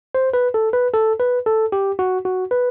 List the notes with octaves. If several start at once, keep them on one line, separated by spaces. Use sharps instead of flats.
C5
B4
A4
B4
A4
B4
A4
G4
F#4
F#4
B4